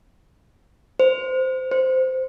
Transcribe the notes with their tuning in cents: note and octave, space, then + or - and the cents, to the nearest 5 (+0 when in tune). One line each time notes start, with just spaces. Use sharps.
C5 -15
C5 -10